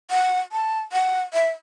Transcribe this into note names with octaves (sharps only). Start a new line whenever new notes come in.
F#5
A5
F#5
E5